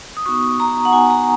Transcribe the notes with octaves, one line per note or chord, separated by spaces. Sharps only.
D#6
B3 D#4 F#4 C#6
A#5
F#5
B3 D#4 F#4 G#5
A#5